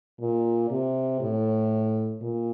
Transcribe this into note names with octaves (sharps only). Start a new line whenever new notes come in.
A#2
C3
A2
A#2